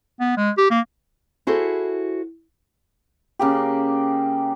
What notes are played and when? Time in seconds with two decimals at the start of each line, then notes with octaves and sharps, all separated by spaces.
0.20 B3
0.37 G#3
0.58 G4
0.71 A#3
1.47 E4 F#4 G#4 A4 C5
3.39 C#3 A#3 G4